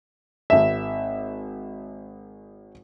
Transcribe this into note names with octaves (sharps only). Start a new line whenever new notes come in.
G#1 E5